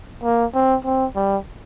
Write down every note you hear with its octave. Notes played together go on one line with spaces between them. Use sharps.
A#3
C4
C4
G3